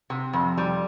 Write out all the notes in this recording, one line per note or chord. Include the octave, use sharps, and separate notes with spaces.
C3
F2
G3